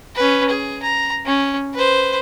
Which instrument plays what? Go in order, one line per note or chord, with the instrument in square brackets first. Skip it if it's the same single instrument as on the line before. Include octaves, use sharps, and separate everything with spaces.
[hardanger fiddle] C#4 B4
G#4
A#5
C#4
B4 C5